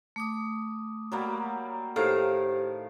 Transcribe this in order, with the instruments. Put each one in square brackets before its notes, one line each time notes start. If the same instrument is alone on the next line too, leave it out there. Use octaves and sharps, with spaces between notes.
[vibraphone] A3 D6 D#6
[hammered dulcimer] F#3 G3 A#3
[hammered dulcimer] A2 D#3 F5 [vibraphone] G4 C5 [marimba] A4